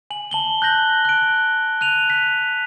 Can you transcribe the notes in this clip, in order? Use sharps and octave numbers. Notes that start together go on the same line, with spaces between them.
G#5 F#7
A5 F#7 G7
F#6 G6 A#6 F#7
F#6 D7
F#6 D#7 F7
B6